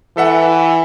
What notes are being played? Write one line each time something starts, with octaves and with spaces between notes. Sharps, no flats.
E3 A4 E5 F#5